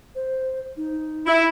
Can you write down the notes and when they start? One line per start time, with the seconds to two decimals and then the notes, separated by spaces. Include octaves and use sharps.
0.15 C5
0.77 D#4
1.26 E4